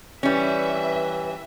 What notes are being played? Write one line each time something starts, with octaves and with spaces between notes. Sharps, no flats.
E3 G3 C#4 B4 E5